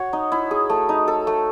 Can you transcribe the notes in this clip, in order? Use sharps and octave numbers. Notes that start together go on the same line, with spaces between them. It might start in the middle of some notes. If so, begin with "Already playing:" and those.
Already playing: F#4 C#5
D#4
E4
G#4
A3
D#4
A4
A3